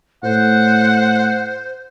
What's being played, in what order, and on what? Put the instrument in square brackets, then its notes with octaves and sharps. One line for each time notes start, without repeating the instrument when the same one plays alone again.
[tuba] A2 [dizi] C5 [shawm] F#5